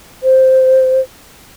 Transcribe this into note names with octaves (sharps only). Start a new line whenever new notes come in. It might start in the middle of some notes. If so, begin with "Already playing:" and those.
C5